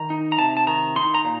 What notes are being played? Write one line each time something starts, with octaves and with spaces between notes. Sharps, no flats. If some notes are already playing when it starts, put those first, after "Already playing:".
Already playing: D#3 A#5
D#4
A#5
C3 A5
A5
D#3 A#5
D#4 C6
A#5
A#2